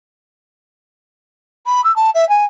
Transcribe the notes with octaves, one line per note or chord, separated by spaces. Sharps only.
B5
E6
A5
E5
G#5